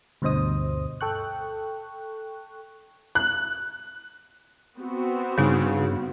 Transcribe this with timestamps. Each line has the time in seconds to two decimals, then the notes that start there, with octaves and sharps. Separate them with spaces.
0.22 D2 G2 B2 C5 D#5 D#6
1.01 A4 G5 C#6 F#6
3.15 F#6
4.76 B3 C4 F#4
5.38 G2 C#3 G3 D#4